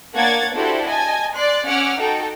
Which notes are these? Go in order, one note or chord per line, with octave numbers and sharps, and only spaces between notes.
A#3 D4 C#5 F#5 G#6 A6
D4 E4 F#4 G4 A4 C5
D#5 G#5 A5
D5 C6 F#6
C#4 F#5 D6 E6 F6
D#4 F#4 A4 G5